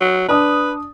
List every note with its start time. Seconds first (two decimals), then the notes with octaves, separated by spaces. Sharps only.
0.01 F#3
0.28 D4 B4 D#6